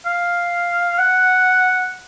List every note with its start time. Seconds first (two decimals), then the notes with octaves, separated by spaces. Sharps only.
0.06 F5
0.99 F#5